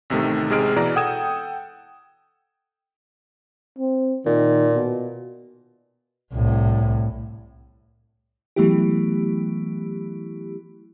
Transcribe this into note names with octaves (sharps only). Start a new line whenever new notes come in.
A1 C3 D#3 A3
A1 C3 G#3 G#4 F6 D7
B2 E3 D5 A#5
A4 F#5 G5 D#6 G#6 E7
C4
A#2 D#3
B2
C2 A2
E3 F#3 A3 B3 E4 G4